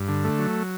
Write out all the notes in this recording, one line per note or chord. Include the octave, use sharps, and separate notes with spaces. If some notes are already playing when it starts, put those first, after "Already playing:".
Already playing: G2
D3
A3
F#3